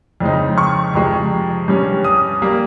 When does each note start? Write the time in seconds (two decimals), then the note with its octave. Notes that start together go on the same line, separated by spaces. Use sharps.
0.20 F2 C#3 G#3 C4 D#4
0.58 C#6
0.94 F2 C3 F3 G#3
1.68 G2 G3 C#4
2.04 D#6
2.42 G3 A#3